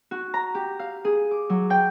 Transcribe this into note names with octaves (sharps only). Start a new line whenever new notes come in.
F#4
A#5
G4
F5
G#4
D6
F#3
G5